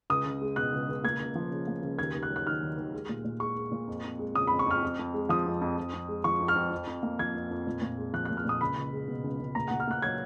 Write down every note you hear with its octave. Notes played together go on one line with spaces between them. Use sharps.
C#2 D#6
C#2
G#3
B2 F#6
C#2
C#2
A#3 G#6
C#2
F3
C#3
A#3
C#2
D#2 G#6
D#2
F#6
F#3
F#6
D#3 F6
D#2
D#2
G#3
A#2
A#2
G#3 C#6
G#3
A#2
F2
F2
G#3
C#3 D#6
B5
F2
C#6
F2 F6
F2
F2
G#3
F3 D#6
F2
F2
F2
F2
G#3
F3 C#6
F2
F6
F2
F2
F2
A#3
F3 G#6
F2
F2
A#2
A#2
G#3
F3 F#6
F#6
A#2
F6
A#2 D#6
C#2 B5
C#2
G#3
B2
C#2
C#2
A#2 A#5
A#2 F#5
F6
A#3 F#6
F#3 G#6